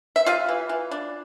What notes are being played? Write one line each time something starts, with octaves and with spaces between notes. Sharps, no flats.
E5
G3 F4 F5
E3
E3
D4